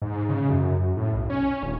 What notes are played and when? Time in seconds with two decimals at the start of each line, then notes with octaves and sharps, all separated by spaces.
0.02 G#2
0.29 C#3
0.50 F#2
0.97 A2
1.13 B1
1.30 C#4
1.63 D#1